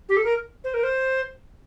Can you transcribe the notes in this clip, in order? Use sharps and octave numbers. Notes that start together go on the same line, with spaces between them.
G4
A4
A#4
C5
A#4
C5